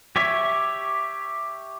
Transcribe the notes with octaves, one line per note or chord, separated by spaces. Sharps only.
G4 C#5 E5